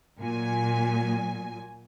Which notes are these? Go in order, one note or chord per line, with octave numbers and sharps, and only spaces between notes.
A#2 F#3 G#5